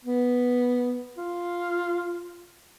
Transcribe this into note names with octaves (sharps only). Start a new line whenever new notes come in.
B3
F4